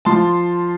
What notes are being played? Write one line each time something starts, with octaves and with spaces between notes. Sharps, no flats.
F3 A5 C6